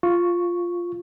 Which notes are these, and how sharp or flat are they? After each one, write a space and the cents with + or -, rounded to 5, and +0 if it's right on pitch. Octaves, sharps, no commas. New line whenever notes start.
F4 +0 C#6 +0